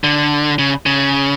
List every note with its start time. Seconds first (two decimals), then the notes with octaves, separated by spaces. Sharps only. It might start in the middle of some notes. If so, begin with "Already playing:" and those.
0.04 D3
0.59 C#3
0.86 C#3